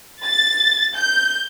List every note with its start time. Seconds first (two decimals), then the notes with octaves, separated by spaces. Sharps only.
0.25 A6
0.95 G6